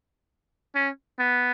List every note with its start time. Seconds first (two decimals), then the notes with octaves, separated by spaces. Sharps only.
0.75 C#4
1.19 B3